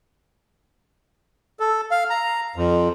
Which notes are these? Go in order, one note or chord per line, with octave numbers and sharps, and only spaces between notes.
A4
F5
A#5
F2